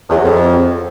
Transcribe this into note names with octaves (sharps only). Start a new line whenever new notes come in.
E2
F#3
F2